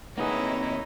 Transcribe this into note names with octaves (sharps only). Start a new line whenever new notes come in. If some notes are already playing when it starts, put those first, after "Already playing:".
C3 A#3 D#4 E4 G#4 B4 C#5 F#5